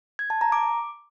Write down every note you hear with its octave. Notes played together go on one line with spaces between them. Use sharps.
G#6
A5
A#5
D6